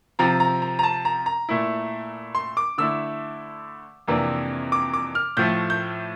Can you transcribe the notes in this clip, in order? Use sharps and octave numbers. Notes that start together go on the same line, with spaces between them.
C3 F3 C4 A#5
A#5
A#5
A#5
A5
A#5
A#5
A#2 A3 E4
C6
D6
D3 A3 E4 E6
F2 C3 E3 A#3 D4
D6
D6
F6
A2 F3 A3 G6
G6